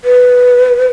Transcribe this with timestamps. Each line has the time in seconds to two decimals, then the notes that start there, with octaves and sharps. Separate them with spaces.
0.04 B4